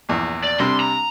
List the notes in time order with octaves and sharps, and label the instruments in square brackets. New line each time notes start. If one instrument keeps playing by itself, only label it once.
[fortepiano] A#1 E2
[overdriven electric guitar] D5
[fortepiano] C3 G3 D4 [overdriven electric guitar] C6
[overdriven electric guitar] A#5